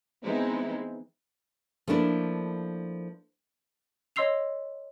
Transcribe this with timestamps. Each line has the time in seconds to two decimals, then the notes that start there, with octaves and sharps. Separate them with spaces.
0.24 E3 G#3 B3 C4 D#4 E4
1.87 F3 A3 A#3 D4 E4
4.16 C#5 D#5 C6 E6 C7 F7